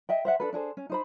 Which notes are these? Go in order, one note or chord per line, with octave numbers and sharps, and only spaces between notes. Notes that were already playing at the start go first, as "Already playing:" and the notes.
D#5 E5 G5
C5 E5 F#5
D4 A4 B4
D4 G#4 A4 C5
C#4
D#4 C5 B5